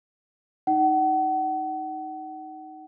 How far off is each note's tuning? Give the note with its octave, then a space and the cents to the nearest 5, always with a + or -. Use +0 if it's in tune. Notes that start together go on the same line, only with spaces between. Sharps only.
D#4 +0 F#5 +35